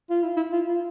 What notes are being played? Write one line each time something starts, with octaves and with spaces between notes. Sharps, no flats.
F4
E4
E4
F4
F4